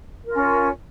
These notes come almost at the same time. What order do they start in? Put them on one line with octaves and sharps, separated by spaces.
A#4 F4 C#4